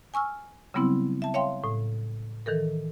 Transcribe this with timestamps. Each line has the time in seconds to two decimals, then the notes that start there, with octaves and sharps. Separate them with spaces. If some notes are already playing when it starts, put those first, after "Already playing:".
0.14 G#5 C#6 E6 F6
0.74 C#3 F#3 G3 B3 C4 E4
1.22 E5 A5
1.34 C#5 E5 F5 G5 C6
1.64 A2
2.46 D#3 E3 A4 A#4